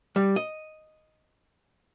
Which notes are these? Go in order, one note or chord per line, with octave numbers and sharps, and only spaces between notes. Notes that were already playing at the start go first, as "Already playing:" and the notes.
G3
D#5